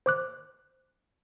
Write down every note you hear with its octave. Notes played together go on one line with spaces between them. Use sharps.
C5 D6 F#6